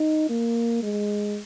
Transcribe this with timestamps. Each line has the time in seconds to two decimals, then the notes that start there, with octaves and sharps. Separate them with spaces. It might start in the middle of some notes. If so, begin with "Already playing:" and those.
Already playing: D#4
0.30 A#3
0.83 G#3